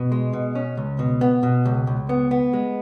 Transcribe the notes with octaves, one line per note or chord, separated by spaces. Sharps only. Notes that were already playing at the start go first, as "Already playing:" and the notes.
Already playing: B2
G#3
B2
C#4
C#2
B2
B3
B2
C#2
C#2
B3
B3
G#3